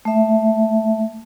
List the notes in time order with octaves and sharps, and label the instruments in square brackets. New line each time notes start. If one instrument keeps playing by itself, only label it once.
[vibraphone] A3 E5